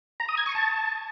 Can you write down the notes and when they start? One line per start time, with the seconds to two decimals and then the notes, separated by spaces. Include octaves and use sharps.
0.20 A#5
0.29 D#6
0.37 G#6
0.46 C#6
0.55 A5